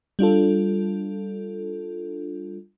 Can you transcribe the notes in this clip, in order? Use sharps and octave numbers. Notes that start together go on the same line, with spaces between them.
G3 D4 F4 A4